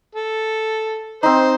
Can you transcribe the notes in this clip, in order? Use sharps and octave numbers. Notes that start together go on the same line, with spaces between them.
A4
C4 D#4 C5